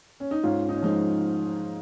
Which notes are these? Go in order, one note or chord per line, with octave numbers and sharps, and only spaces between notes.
C#4
D#4
G#2 C#4 F4
D#4
C#4
F3 G#3 D#4